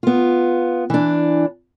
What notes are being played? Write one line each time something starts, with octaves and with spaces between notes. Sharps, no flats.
B3 F4
E3 D4